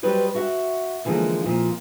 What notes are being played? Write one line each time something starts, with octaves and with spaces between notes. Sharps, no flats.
F#3 G3 B4 C5 D#5
F#4 E5 F#5
D3 E3 F3 G#3 A#3
F2 A#2 F3